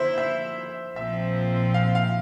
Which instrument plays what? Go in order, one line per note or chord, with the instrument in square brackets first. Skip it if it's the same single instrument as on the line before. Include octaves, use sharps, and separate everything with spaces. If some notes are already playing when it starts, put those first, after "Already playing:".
Already playing: [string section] D3 F3 A#3 E4 [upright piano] C5 E5
[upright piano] E5
[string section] A#1 A#2 F3 C4 [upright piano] E5
[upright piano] F5
F5